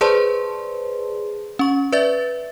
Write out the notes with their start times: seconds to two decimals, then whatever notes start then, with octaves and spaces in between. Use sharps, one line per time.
0.01 G#4 B4 C5 D5 A5 C6
1.59 C#4 C#6
1.92 B4 D5 E5 A6